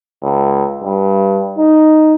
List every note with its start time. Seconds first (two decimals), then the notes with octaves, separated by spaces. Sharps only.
0.22 C#2
0.84 G2
1.58 D#4